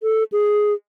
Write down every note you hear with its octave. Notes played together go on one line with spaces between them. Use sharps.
A4
G#4